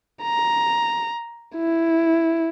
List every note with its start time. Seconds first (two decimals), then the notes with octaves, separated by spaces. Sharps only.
0.23 A#5
1.56 E4